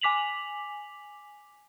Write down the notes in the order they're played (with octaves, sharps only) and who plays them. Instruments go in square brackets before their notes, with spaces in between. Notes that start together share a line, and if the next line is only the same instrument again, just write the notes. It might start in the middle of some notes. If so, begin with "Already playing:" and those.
[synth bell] G#5 D6 B6 F7 F#7